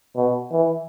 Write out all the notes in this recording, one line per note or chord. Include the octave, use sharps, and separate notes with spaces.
B2
E3